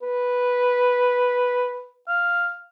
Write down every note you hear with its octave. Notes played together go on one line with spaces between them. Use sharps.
B4
F5